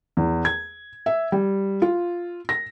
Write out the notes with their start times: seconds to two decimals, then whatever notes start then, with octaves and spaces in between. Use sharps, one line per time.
0.17 E2
0.45 G#6
1.06 E5
1.32 G3
1.82 F4
2.49 A#6